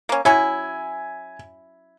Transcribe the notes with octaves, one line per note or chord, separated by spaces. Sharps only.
A#3 C#4
F#3 C#4 E4 G#5